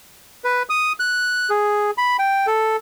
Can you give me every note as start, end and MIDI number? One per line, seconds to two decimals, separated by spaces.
0.44 0.63 71
0.69 0.93 87
1.00 1.50 90
1.50 1.91 68
1.98 2.17 83
2.19 2.46 79
2.47 2.76 69